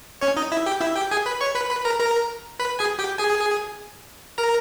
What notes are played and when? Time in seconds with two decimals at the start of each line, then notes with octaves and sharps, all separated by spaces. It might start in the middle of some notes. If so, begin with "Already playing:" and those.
0.21 C#4 C#5
0.37 D#4 D#5
0.52 E4 E5
0.66 G4 G5
0.81 E4 E5
0.96 G4 G5
1.11 G#4 G#5
1.26 B4 B5
1.41 C#5 C#6
1.55 B4 B5
1.71 B4 B5
1.85 A#4 A#5
2.00 A#4 A#5
2.59 B4 B5
2.79 G#4 G#5
2.99 G4 G5
3.19 G#4 G#5
4.38 A#4 A#5